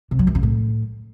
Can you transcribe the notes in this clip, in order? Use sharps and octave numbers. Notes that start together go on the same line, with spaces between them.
C3
F#3
F#2
C#3
A2